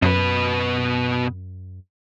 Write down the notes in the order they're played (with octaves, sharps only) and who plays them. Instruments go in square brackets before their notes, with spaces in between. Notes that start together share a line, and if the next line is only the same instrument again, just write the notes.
[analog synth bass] F#2 [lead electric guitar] B2 B4